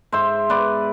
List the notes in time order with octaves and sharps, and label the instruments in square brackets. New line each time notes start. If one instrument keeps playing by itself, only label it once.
[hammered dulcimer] G#2 C5 E5
B3 B4 D5